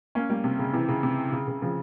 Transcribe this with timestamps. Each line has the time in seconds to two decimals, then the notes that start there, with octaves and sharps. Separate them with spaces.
0.15 A#3 C#4
0.29 G3 A#3
0.44 C3
0.59 C#3
0.73 C3 E3
0.89 C#3
1.03 C3
1.32 C#3
1.48 C#3
1.62 C#3 F3